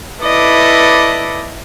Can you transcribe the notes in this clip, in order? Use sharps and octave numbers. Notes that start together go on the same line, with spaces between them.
E4 A4 B4 D5 D#5 D6